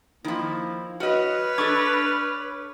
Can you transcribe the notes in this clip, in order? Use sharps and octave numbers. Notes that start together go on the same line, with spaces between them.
D#3 F3 A#3 E4
F#4 B4 C#5 D#5 F6
D4 A4 C#6 D6 G#6